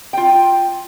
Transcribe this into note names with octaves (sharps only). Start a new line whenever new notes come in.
F4 G5